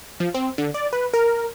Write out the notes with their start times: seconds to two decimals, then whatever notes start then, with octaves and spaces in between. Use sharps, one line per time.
0.20 F3
0.34 C4
0.58 D3
0.74 D5
0.93 B4
1.14 A#4